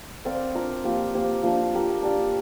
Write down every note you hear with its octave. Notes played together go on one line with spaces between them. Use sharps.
C4 A#4 D5 F5
D4 F4 A#4 F5
F3 A#3 G4
A#3 G4 C5
F3 A#3 D4
D4 G4 A#4
D4 G4 D5 F5